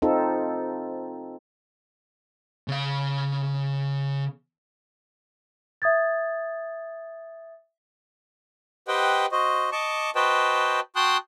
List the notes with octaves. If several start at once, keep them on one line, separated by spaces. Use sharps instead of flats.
C4 D#4 F4 A4
C#3 F5
E5 D#6 G#6 A6
G4 B4 C5 D#5 F#5 G5
F#4 C5 D#5
D#5 A5 C#6 D6
F#4 B4 C5 D#5 G5 A5
F#4 G5 A5 C6 D#6 F#6